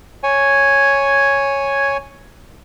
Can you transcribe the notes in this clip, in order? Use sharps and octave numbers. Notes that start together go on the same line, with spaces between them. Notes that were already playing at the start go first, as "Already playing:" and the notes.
C#5 G#5